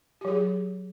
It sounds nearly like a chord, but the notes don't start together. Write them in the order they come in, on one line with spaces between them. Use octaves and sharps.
G4 F#3 G#4